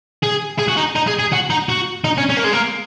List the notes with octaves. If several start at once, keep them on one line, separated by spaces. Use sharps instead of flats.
G#4
G#4
F#4
D#4
D#4
G#4
G#4
F#4
D#4
F#4
D#4
C#4
C#4
A#3
G#3
A#3